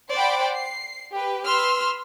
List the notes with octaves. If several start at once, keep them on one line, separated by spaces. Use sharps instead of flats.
C5 D5 F#5 G5 B5
C7
G4 B4
B4 C6 E6 F6